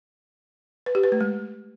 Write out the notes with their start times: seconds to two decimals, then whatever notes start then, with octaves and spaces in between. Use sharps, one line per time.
0.86 B4
0.95 G4
1.03 B4
1.12 A3
1.21 G#3